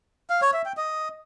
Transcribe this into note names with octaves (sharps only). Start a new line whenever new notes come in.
F5
C#5
E5
G5
D#5